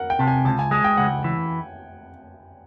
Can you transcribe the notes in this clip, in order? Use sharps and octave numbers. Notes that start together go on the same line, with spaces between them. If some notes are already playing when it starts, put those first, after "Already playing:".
Already playing: A#4 F#5
G5
C3 A5
G#5
C#2 A5
G#5
G#3 G#5
G5
C#2 F#5
E3